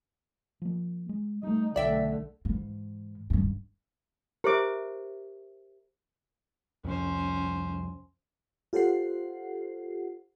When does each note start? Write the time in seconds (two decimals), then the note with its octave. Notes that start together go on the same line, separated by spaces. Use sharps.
0.62 F3 A#3
1.09 G#3
1.43 G3 A3 D#4
1.76 B1 D3 A3 D5 E5 G5
2.45 G#2 E3
3.30 D#1 G2
4.44 G4 A#4 C5 E5 D6
6.85 C2 F2 C#4 C5
8.73 F4 G4 A4 C5 F#5 C7